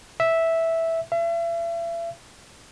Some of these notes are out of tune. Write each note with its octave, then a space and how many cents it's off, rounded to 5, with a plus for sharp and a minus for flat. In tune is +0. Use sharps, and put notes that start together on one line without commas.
E5 -5
E5 +40